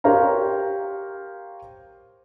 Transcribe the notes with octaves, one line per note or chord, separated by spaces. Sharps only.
G4 A#4 C5 C#5 F5 A#5